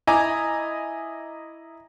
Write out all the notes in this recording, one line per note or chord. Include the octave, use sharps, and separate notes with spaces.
E4 D#5 G#5 A#5 B5 D6